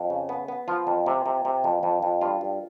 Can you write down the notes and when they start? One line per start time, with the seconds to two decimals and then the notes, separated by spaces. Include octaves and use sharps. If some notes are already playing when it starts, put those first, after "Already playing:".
Already playing: F2
0.10 C#3
0.29 B3
0.48 B3
0.68 F3 F4
0.87 F2
1.06 C3
1.26 C3
1.45 C3
1.64 F2
1.83 F2
2.03 F2
2.21 G2 F4
2.41 G2